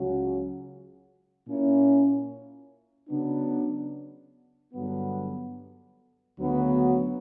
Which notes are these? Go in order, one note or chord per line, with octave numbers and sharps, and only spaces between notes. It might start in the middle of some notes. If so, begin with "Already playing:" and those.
Already playing: C#2 C#3 F#3 C#4 F#4
A#2 A#3 C#4 E4
C#3 F#3 B3 D4
G2 D3 F#3 B3
D2 C#3 F#3 B3 F#4